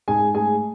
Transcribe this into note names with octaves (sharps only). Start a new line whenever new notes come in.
G#2 G#4 G#5
A3 G#4 G#5